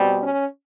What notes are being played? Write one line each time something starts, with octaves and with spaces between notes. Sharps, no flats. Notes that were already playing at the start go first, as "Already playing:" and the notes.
Already playing: B2 G3 C4
C#4